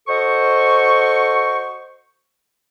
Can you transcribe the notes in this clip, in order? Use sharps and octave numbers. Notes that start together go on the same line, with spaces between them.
F#4 A4 C5 D#5 C#6